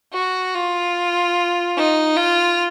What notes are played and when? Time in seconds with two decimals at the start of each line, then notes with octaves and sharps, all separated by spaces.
0.13 F#4
0.54 F4
1.77 D#4
2.17 F4